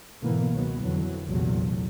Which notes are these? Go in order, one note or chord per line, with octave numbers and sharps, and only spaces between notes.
G#2 B2 D3 E3 A#3 B3
C#2 D#3 F#3 B3
F2 D3 E3 F#3
A#1 E2 C3 F#3 A3